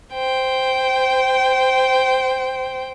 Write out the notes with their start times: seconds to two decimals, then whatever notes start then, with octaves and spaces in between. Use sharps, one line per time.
0.14 C5 G5